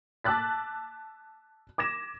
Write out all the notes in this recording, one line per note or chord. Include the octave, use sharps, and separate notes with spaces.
A5 D6 E6 F#6 A6 B6
D6 G#6 A#6 E7